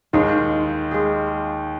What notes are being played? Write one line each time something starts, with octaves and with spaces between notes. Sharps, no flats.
D#2 D#3 G#3 F4 G#4
G#3 F4 G#4